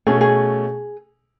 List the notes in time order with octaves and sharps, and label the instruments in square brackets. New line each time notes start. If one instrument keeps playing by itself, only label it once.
[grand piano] B2 A3 C#4 [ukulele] G#4
[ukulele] G#4